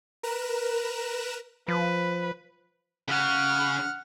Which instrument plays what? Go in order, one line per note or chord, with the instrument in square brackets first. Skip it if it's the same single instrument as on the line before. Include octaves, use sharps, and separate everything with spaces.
[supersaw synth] A#4 B4 A#5 F#6 E7
[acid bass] F3 [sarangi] B4
[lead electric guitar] C#3 [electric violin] F#5 F6